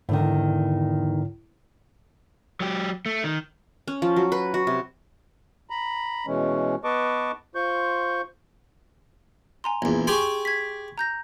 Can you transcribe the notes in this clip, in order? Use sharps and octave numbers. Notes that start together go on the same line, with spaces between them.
E2 G#2 D3 D#3
F#3 G4
A3
D#3
C#4
F3
F#3
B4
F#4
C3
A#5 B5
B2 E3 G#3 C#4
B3 B4 D#5 A5 C#6 D6
F4 C5 C#6 G6
G#5 A#5 C6
A#1 E2
G4 G#4 G#5 C6 C#6
G#6 B6
A#5 G6 A#6